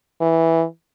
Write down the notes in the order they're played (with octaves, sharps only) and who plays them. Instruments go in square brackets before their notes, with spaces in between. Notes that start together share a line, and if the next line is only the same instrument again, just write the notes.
[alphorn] E3